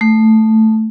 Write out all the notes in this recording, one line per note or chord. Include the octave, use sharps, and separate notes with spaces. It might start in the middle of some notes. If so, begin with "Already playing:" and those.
A3